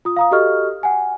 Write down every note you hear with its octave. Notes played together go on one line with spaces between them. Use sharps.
F4 D#6
F5 A#5 D#6
F#4 G4 A4 D#5 C#6 F6
F#5 G#5